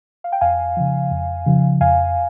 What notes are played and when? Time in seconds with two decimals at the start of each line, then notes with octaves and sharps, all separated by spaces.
0.24 F5
0.32 G5
0.41 F2 F5 G#5
0.77 C#3 F3
1.11 F2
1.46 C#3 F3
1.81 F2 F5 G#5